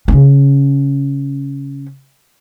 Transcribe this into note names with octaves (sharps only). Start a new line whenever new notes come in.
C#3 C#4